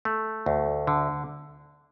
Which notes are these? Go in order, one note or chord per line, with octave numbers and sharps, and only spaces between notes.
A3
D2
D3